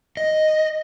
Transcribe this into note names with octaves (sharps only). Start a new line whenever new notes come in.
D#5